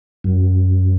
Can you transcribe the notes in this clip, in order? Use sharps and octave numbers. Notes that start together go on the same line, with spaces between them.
F#2